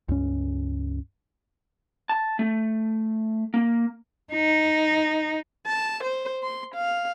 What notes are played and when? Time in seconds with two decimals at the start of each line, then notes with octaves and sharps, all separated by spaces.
0.09 C#2 G2 C#4
2.09 A5
2.39 A3
3.54 A#3
4.33 D#4
5.66 A5
6.03 C5
6.43 C6
6.75 F5